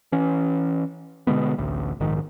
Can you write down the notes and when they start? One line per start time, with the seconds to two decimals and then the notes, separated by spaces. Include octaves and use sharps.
0.12 E3 C#4
1.27 B2 D3 G#3 B3
1.58 A1 D2
2.00 A#1 G#2 D#3